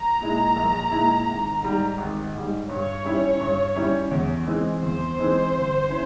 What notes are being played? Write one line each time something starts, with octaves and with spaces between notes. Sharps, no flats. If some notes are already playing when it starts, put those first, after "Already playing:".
Already playing: A#5
A#2 G#3 E4
A#1
A#2 G#3 E4
G#1
G#2 G3
G#1
G#2 G3
G2 C#5
G3 C#4 E4
G2
G3 C#4 E4
E2
E3 G#3 C4
E2 C5
E3 G#3 C4
G1
C#4 E4